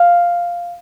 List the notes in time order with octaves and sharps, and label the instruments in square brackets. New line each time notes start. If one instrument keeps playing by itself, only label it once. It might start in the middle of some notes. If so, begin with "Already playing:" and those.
Already playing: [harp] F5